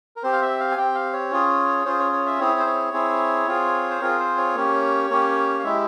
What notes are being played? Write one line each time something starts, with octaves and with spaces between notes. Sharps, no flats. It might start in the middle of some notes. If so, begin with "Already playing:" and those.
A#4
C4 G4 C5
F5
E5
F5
G#5
C4 G4 G5
F5
C#5
C#4 F4 G#4
C#4 F4 G#4 C5
C#5
C#5
E5
C4 E4 G#4 C#5
C5
C#5
C4 E4 G#4
C4 F4 G#4
C5
C4 F4 G#4 A#4
C5
C#5
A#3 C#4 G4
A#3 C#4 G4
F5
G#3 E4 G4 E5